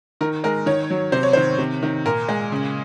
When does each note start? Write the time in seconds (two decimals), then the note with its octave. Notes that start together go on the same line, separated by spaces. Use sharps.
0.21 D#3 A#4
0.44 G#3 A#4
0.66 D#3 C#5
0.90 F#3
1.12 C3 C5
1.23 C#5
1.33 D#3 C5
1.59 C3
1.83 D#3
2.05 A#2 A#4
2.29 G#3
2.52 C#3